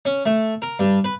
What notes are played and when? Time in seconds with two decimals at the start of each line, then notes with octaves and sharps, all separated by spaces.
0.05 C#4
0.26 A3
0.62 A#4
0.79 G2
1.04 B4